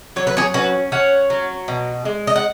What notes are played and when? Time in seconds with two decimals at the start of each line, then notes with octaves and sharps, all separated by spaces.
0.16 F#3 C#5
0.27 B4
0.37 G#4 C#5
0.54 C#4 F#4 B4
0.92 C#4 C#5 F#5
1.30 F#3
1.68 B2
2.05 G#3
2.27 D#5
2.36 F#5